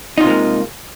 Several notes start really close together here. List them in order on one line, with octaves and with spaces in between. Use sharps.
D#4 F4 C3 A#3 G#3